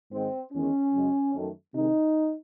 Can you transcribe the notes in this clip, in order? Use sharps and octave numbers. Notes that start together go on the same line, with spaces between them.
G#2 D#3 G#3 C4
E2 D#3 G#3 C#4
F#2 C#3 G#3
F#2 D#3 A3
C3 D#3 G#3 D#4